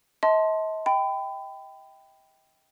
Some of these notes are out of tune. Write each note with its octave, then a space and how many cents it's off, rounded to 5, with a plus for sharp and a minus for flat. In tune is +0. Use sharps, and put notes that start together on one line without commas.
D#5 +45 A5 +0 C6 +0
G5 +0 B5 +30